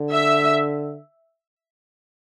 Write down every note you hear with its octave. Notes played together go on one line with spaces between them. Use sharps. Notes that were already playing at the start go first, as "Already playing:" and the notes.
Already playing: D3
E5